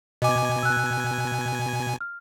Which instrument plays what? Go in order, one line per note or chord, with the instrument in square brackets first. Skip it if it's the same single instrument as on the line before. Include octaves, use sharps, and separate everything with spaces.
[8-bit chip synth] B2 G#5 [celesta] D#5 D6
[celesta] E6 F#6
F6